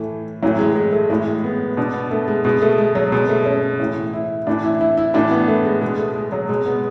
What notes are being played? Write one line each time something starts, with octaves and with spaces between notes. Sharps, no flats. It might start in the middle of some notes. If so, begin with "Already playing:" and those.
Already playing: A2 E3 A3
A2 E3 F#3
G#3
G#3
A3
A2 E3 G#3
B3
B2 D4
B3
A3
G#3
B2 G#3
A3
G#3
F#3
B2 G#3
A3
C#4
A2 E3
E4
A2 E3 D4
E4
E4
E4
A2 E3 D4
B3
A3
G#3
B2 G#3
A3
G#3
F#3
B2 G#3
B3